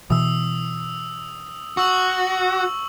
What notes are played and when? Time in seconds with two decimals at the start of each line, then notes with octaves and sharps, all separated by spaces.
0.10 B2 E3 D#6 E6
1.77 F#4 C#6 E6 F#7